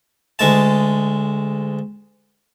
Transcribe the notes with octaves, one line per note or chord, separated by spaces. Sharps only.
D2 G#3 A5